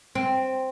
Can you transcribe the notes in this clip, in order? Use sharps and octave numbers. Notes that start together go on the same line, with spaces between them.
C4